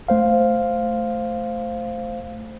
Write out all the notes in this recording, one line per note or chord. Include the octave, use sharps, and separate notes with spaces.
A3 C5 F5